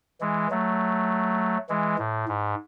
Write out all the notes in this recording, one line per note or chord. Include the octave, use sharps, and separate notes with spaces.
E3 G#3
F#3 A3
E3 G#3
A2
G#2